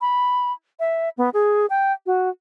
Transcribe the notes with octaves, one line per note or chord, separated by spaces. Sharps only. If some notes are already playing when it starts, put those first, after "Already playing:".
B5
E5
B3
G#4
G5
F#4